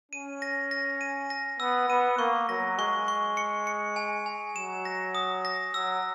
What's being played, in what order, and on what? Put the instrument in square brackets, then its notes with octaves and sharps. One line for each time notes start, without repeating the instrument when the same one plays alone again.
[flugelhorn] C#4 [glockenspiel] D#7
[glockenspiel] A#6
A#6
D#7
A#6
[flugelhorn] B3 [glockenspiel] E6
[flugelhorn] B3 [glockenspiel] D#7
[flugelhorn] A#3 [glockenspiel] C#6
[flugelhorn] F#3 [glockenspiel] A#6
[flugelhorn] G#3 [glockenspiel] C#6
[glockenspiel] C#6
C#7
C#7
G#5
G#5
[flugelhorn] F#3 [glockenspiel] E7
[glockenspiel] A#6
D#6
A#6
[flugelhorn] F#3 [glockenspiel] E6